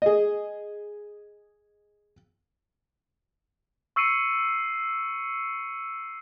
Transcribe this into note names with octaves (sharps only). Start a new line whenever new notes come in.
G#4 D#5
C#6 E6 C7 C#7 D#7